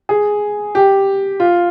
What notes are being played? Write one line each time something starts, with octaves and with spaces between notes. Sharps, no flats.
G#4
G4
F4